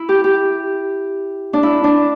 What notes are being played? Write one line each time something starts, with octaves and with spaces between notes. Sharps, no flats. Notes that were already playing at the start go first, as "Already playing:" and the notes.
Already playing: E4
G4
G4
D4
E4
D4